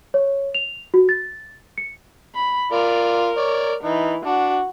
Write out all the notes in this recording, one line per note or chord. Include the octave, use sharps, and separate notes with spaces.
C#5
F7
F#4
A6
C#7
B5
F4 A#4 D5
C#5 D5
E3 D#4
D4 F#4